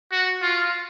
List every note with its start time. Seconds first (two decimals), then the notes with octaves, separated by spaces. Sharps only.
0.11 F#4
0.42 F4